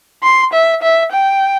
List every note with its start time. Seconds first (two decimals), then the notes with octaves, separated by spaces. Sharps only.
0.23 C6
0.53 E5
0.82 E5
1.12 G5